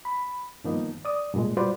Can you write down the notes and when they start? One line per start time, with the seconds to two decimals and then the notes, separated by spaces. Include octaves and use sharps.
0.05 B5
0.64 G2 D#3 F3 A#3 B3 D#4
1.05 D5 D#6
1.34 G2 A#2 G#3
1.57 G3 F4 F#4 B4 C5 D5